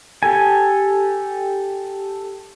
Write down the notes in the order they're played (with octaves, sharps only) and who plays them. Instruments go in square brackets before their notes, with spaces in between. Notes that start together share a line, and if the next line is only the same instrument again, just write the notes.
[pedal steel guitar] G4 A4 G#5